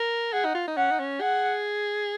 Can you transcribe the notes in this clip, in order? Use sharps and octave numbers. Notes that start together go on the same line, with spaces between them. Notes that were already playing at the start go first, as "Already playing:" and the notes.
Already playing: A#4
G#4 F#5
D#4
F4
D#4
C#4 F#5
D#4
C#4
G#4 F#5